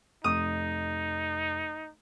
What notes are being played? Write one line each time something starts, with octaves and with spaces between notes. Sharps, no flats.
F1 D#4 D#6